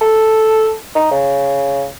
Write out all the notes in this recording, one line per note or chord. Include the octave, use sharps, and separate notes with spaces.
A4
D#4
C#3